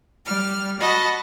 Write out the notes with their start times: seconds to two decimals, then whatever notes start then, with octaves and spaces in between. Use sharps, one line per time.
0.25 G3 F6
0.80 F#4 D#5 A5 B5